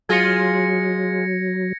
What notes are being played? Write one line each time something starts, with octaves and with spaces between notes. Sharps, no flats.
F#3 G#3 F4 G#4 G#6 A#6 C#7